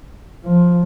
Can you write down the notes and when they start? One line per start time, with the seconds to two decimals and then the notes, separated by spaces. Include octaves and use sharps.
0.46 F3